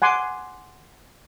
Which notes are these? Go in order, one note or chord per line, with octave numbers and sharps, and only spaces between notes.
F#5 G#5 C6 D6